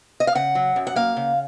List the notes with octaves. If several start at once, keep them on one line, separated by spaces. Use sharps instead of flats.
D#5
F5
C#3 F#5
F#3
F#2
F#5
A#3 F5
C#3